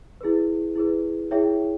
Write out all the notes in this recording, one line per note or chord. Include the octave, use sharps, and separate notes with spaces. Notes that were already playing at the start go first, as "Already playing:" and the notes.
E4 G#4 B4
E4 G#4 B4
E4 G#4 C#5 E5 G5